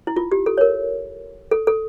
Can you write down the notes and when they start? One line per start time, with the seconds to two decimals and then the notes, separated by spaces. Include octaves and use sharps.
0.07 E4
0.16 F4
0.32 G4
0.46 A4
0.58 C#5
0.61 A#4
1.51 A4
1.67 A4